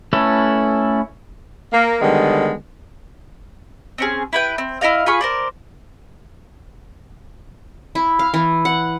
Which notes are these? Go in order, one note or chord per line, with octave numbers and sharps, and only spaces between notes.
A3 C#4 E4 A4 B4
A#3
D3 D#3 G3 G#3 B3
C4 C#4 G#4
E4 B4 G5
C4
E4 A#4 D#5 F5
F4 G#4 B5 C#6
A#4 C5 D5
E4
F5
E3
F#5